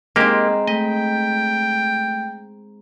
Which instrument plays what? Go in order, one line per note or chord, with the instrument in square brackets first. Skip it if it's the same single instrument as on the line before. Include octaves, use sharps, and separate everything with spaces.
[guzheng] G#3 C4 D#4 [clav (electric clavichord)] A#3 G4
[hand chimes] A3 B6 [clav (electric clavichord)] D#5 [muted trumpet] G5